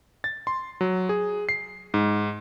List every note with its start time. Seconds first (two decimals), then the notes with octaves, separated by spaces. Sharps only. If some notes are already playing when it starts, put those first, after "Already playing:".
0.24 A6
0.47 C6
0.81 F#3
1.09 G#4
1.49 C7
1.94 G#2